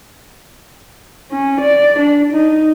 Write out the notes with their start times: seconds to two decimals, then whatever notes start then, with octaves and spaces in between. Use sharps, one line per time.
1.32 C#4
1.61 D5
1.99 D4
2.33 D#4